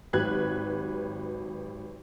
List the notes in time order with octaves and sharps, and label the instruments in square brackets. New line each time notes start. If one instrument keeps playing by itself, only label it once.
[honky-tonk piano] G#1 F#3 G4 B4 F#6 G#6